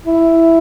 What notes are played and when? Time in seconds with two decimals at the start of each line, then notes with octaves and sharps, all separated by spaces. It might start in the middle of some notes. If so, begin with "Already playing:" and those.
0.05 E4